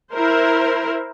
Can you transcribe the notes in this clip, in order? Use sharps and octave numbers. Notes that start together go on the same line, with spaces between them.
E4 A#4 C5